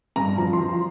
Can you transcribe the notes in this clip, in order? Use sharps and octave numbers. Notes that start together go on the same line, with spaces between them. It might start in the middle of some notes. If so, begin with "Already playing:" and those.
G2 A#5
F3 A#5
C6
F3
C6